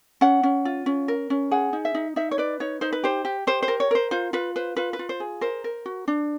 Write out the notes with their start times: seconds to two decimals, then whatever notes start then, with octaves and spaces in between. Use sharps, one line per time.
0.21 C#4 F#5
0.43 C#4
0.65 F4
0.86 C#4
1.08 A#4
1.30 C#4
1.51 G#4 F#5
1.73 D#4
1.85 E5
1.95 D#4
2.16 D#4 E5
2.31 C#5
2.38 B4 D5
2.60 D#4 C#5
2.81 D#4 C5
2.92 B4
3.04 G4 C5
3.25 G4
3.47 G4 C5
3.63 C5
3.68 A#4
3.80 C#5
3.91 A#4 C5
4.11 F4 C5
4.33 F4 B4
4.56 B4 C5
4.77 F4 B4
4.93 B4
4.99 F4
5.09 C5
5.20 G#4
5.41 A#4 C5
5.64 A#4
5.86 F#4
6.08 D4